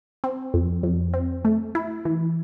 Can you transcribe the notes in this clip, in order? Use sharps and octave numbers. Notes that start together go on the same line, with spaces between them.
C4
F2
F2
C4
A3
E4
E3